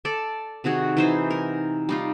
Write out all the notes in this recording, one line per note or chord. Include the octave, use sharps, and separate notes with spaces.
A4 D5
C3 D#3 F#4 G#4
E3 D#4 C5
A#4
G3 D#4 F4